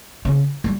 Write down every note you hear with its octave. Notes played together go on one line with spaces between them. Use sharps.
C#3
G3